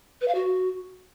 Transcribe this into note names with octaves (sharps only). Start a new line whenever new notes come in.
B4
F5
F#4